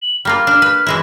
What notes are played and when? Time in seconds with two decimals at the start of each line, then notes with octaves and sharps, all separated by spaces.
0.02 F#7
0.25 G3 A#3 F4 F6
0.47 D4
0.62 B4
0.87 E3 G#3 E4